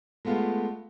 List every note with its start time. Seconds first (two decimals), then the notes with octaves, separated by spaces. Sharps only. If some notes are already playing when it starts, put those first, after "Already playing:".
0.25 G#3 A3 B3 F4